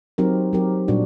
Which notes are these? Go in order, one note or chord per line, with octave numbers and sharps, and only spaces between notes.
F#3 C4 D#4 G4 A#4
F#3 C4 D#4 G4 A#4
A#2 G3 D4 F#4